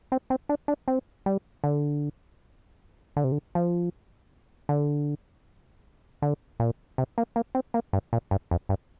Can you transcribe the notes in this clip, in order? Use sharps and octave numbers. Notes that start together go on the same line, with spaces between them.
C4
C4
D4
D4
C4
G3
D3
D3
C3
D3
F3
D3
D3
A#2
C3
A#3
A#3
C4
A#3
G2
A#2
G2
F2
G2